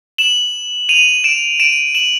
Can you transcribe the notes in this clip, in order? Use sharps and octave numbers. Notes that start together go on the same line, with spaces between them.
E7 F#7
D#7 F7
D7 E7
D7 E7
E7 F#7